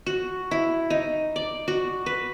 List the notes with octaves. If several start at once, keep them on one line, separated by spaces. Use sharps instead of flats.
F#4
E4
D#4
D5
F#4
B4